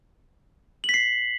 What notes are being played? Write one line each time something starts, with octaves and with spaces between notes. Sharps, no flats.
B6 C7 F#7